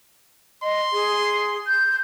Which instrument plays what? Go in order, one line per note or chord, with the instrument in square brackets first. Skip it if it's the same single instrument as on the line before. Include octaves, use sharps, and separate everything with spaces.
[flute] D#5 [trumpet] C6
[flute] G#4
G6